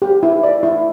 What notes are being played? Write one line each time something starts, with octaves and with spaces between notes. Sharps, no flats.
G4
E4
D5
E4